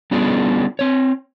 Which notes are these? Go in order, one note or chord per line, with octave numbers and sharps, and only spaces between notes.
G3 B3 C#4 D4 F4 G#4
C4 C#5